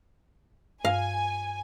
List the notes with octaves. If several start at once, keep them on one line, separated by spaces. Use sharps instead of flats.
G2 F5 G#5